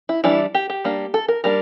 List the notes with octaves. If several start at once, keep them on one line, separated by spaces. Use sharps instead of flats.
E4
E3 G3 D4 E4
G4
G4
G3 A#3 D4
A4
A#4
G3 A#3 D4 A#4